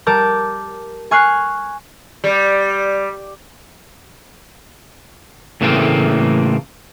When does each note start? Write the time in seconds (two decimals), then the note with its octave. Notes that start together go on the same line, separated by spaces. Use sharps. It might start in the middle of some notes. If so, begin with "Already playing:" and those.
0.06 G3 A#4 A5 D6 G6
1.11 G#5 C#6 F6 F#6 C7
2.24 G3
5.61 A2 C#3 E3 A3 A#3 C4